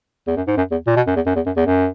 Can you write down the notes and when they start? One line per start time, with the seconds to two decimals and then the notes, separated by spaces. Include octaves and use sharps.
0.27 E2
0.37 F#2
0.47 G#2
0.57 F#2
0.71 E2
0.87 A#2
0.96 B2
1.07 F#2
1.16 E2
1.26 F#2
1.36 E2
1.46 F#2
1.56 E2
1.66 F#2